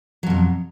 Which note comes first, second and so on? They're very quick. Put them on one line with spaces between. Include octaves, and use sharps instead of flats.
F#3 F2 B2